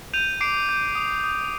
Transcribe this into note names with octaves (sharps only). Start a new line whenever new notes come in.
G6 D#7 F7
D6 C7 D7
G6
D#6
D#6